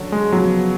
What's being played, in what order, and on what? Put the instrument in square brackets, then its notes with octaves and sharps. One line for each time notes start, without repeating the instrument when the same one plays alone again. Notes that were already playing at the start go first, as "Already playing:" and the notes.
Already playing: [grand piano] D3 F#3 C#4 F#4 A4
[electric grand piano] G#3
[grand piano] C#3 F3 B3 [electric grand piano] F#3